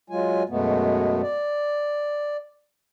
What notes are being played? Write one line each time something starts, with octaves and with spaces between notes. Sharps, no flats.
F#3 G#3 F4 G#5
F#2 B2 G#3 A3 B3
D5